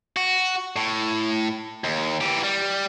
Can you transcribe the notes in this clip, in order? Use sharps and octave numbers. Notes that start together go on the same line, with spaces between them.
F#4
A2
D#2
E3 G4
G3